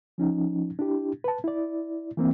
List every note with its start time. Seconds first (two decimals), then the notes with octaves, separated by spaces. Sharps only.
0.18 F3 C#4 D#4
0.79 D4 E4 G4
1.24 B4 A5
1.44 E4 D5
2.17 E3 A#3 C4